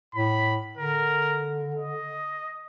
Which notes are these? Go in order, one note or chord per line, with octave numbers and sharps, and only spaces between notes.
A2 B5
D3 A#4
D#5